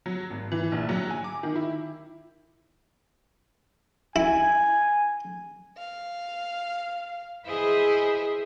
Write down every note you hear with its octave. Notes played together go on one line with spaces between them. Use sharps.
F#3
G#1
E3
A#1
F#3
G#5
D6
D#3
E4
E4 G#5
F5
E4 G#4 B4 C5 D#5 E5